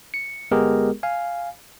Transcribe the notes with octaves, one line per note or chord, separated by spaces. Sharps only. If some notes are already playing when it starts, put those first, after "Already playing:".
C#7
G1 G#3 B3 G4 G#4 A#4
F5 G#5